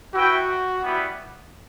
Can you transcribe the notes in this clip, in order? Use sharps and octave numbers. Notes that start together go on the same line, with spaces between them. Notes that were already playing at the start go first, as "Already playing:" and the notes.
E4 F#4 B4 E5 G5
G3 B3 E4